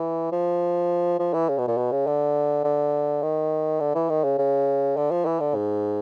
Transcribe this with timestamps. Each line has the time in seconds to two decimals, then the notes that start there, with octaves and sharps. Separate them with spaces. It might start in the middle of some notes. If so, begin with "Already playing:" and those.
Already playing: E3
0.33 F3
1.20 F3
1.34 E3
1.49 C#3
1.58 B2
1.68 A#2
1.77 B2
1.92 C#3
2.07 D3
2.64 D3
3.23 D#3
3.80 D3
3.95 E3
4.10 D#3
4.24 C#3
4.38 C#3
4.97 D3
5.11 F3
5.25 E3
5.40 D3
5.55 G#2